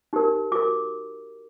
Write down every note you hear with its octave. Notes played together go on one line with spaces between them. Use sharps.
D#4 G4 A#4
F#4 A#4 D6